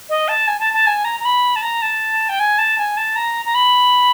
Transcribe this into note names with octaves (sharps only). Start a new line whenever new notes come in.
D#5
A5
G#5
A5
A5
G#5
A#5
A#5
B5
A5
A#5
A5
G5
G#5
A5
G#5
A5
A#5
A#5
B5